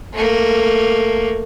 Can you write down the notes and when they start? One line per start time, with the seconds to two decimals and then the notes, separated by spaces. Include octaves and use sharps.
0.13 A3 A#3